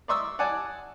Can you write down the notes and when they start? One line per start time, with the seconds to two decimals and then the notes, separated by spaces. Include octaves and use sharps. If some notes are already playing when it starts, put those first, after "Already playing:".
0.08 D5 E5 C6 C#6 D#6 E6
0.39 D5 F#5 G#5 A5